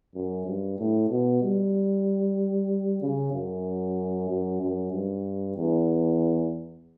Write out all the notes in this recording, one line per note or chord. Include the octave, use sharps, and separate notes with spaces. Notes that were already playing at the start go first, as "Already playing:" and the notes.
F#2
G2
A2
B2
G3
C#3
F#2
F#2
F#2
G2
E2